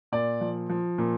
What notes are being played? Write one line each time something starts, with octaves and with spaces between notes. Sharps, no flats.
A#2 D5
F3
F3
A#2